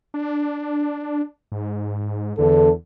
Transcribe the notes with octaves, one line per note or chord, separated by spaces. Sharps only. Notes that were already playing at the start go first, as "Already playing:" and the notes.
D4
G#2
E2 D3 A4